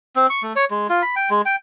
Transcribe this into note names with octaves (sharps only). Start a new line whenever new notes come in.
C4
C#6
A3
C#5
G#3
F4
B5
G5
G#3
G5